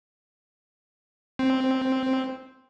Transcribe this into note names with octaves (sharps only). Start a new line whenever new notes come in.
C4